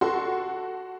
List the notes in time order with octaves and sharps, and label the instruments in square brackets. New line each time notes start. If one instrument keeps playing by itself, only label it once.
[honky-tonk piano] F#4 A4 C6